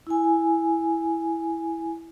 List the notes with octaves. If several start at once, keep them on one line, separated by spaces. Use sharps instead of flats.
E4 G#5